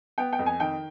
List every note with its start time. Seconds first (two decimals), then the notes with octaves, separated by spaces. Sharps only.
0.18 B3 G5
0.33 G5
0.39 F2
0.46 G#5
0.60 D#3 G5